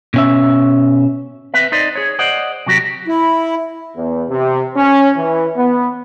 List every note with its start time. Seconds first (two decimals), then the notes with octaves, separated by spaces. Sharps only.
0.14 B2 C#4 E5
1.54 C4 B4 E5
1.72 D#4 C5 D5 D#5
1.96 G#4 C#5
2.19 C5 D5 D#5 F#5
2.66 C3 F#3 F#4 G4
3.08 E4
3.96 E2
4.29 C3
4.76 C#4
5.17 E3
5.57 B3